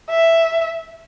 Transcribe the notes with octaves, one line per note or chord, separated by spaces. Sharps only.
E5